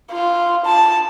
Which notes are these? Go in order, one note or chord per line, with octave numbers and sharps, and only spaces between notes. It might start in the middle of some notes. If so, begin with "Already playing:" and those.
F4
A5